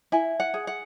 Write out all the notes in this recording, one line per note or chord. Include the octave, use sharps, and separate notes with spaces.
E4 G#5
F#5
G#4
F#5